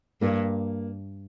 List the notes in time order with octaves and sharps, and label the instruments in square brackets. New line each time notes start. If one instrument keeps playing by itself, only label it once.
[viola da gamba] G2 [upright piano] A#3